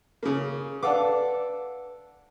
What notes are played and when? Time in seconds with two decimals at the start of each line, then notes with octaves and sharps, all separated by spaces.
0.23 C#3 A#3
0.83 D4 A4 B4 F5 F#5 D6